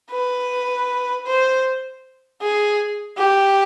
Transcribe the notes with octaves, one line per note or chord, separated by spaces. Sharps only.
B4
C5
G#4
G4